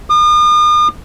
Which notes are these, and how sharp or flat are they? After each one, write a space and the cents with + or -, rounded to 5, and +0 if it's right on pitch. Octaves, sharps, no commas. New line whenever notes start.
D#6 -45